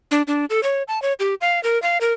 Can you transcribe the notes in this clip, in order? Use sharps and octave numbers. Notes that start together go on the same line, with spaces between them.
D4
D4
A4
C#5
A5
C#5
G4
F5
A#4
F5
A#4